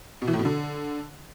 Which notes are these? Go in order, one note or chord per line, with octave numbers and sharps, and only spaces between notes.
B2
E3
A2
B2
D3